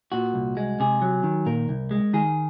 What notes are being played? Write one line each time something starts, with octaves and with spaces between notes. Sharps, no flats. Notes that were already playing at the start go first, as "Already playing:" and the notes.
A#2 F#4
C2
G#3
C3 G#4
F#3
D#3
A#2 A#4
C2
G#3
D#3 G#4